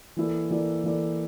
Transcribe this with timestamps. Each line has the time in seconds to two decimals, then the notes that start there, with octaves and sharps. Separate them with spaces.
0.17 E3 A#3 E4 A4 D5
0.50 E3 A#3 E4 A4 D5
0.84 E3 A#3 E4 A4 D5